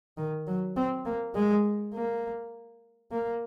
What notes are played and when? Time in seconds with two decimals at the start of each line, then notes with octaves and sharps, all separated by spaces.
0.18 D#3
0.47 F#3
0.77 C4
1.06 A#3
1.35 G#3
1.94 A#3
3.11 A#3